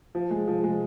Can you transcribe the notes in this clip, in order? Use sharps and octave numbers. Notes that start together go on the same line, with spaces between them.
F3
G#3
F3
G#3